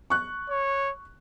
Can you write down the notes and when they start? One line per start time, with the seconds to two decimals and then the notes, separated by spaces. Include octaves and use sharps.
0.10 C#6 F#6
0.49 C#5